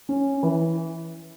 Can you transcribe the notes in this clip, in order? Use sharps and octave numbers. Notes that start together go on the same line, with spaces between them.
C#4
E3